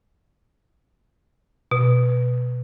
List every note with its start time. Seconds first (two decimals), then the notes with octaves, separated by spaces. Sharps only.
1.71 B2